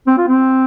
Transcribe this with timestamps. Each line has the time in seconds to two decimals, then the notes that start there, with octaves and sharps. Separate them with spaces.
0.07 C4
0.18 F4
0.27 C4